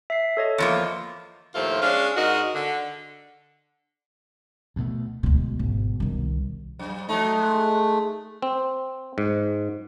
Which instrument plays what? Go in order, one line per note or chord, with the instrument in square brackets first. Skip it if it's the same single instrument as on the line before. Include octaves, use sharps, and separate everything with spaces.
[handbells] E5 C7
A4 C#5 D#5
[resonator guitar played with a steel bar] E2 F3 A#3
[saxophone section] D#2 A2 F3 A3 F4
G#3 C#4 D4 F5
G#2 F#4 A#4 D#5
D3
[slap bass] D2 B2 A3
[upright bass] D2 G#3 [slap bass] B2
[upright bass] G#1
C2 D#3
[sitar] F#2
[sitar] F#3 D#4 [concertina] A3
[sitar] G#3
[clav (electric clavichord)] C4
G#2